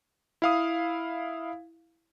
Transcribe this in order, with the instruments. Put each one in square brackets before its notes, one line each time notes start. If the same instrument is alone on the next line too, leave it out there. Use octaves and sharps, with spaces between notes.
[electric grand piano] E4 F5 D#6